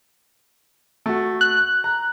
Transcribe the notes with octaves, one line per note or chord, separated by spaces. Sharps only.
A3 F#4
F#6
A#5